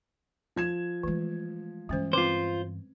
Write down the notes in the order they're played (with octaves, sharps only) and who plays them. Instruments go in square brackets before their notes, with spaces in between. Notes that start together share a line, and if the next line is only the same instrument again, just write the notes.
[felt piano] F3 G#6 E7
[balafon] E3 [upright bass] G#3 A3
[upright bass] G2 E3 [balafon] G#3 C#4 C5
[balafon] C4 B4 D6 [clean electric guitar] F4 C5